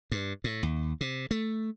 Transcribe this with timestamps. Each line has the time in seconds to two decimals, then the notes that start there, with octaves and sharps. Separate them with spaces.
0.12 G2
0.44 A2
0.63 D#2
1.01 C3
1.31 A3